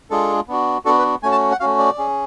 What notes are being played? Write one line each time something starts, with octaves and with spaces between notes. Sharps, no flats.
G#3 D4 F4 G#4 A4
B3 D4 F#4
B3 D4 F#4 A4
B4
A3 C#4 F#4 G#5
A5
F#5
A3 C#4 F#4 F5
D5
C#4 G#4